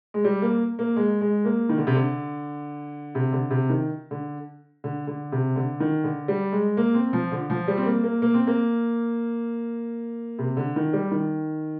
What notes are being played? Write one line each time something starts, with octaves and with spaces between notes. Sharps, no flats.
G#3
G3
A#3
A#3
G#3
G#3
A#3
D#3
D3
C3
D3
C3
D3
C3
D#3
D3
D3
D3
C3
D3
D#3
D3
G3
G#3
A#3
C4
F3
D3
F3
G3
C4
A#3
A#3
A#3
C4
A#3
C3
D3
D#3
G3
D#3